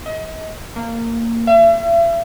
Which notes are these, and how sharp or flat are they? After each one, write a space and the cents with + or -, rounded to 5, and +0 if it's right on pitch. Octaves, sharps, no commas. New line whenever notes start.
D#5 +35
A#3 -20
E5 +40